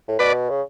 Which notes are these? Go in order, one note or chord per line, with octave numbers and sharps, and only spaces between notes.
A2
B2 B4 D5
C#3